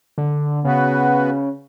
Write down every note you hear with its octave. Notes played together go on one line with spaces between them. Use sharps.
D3
C#3 B3 F#4 B4